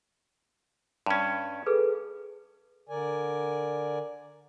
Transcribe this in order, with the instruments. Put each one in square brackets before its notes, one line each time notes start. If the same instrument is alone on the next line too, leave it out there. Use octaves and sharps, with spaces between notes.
[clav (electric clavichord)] G2 C#4
[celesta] G#4 A4 B4
[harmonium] D3 A#4 D5 G#5